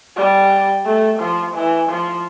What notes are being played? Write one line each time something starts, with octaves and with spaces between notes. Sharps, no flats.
G3
A3
F3
E3
F3